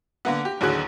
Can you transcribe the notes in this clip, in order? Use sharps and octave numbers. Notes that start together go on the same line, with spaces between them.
D3 A#3 B3
G4
A1 D#2 D3 F#3 G#4 F#6